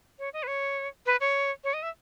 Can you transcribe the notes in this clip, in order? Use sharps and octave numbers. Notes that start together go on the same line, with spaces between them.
C#5
D#5
B4
C#5
B4
C#5
C#5
D#5
E5